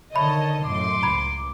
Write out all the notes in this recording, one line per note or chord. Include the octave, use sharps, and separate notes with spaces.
D3 D#3 C#5 D#5 E5 A5 B5
F#2 A2 C6 D6
C#2 A#5 B5 G#6